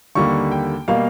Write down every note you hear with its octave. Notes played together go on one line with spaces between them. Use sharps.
D#2 D3 G3 A#3 C#6
G5
B2 G3 A#3 F5